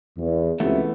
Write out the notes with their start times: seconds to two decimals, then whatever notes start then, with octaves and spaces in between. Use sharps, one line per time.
0.18 E2
0.60 C#2 C3 E3 A3 B3 E5